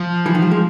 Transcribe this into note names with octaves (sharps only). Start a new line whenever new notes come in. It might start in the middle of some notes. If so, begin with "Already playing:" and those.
Already playing: F3
E3
D#3
G3
G#3